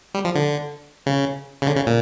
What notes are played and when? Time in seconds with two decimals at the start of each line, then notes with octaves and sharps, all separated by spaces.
0.14 G3
0.25 F3
0.35 D3
1.06 C#3
1.62 C#3
1.67 D3
1.76 C#3
1.86 A#2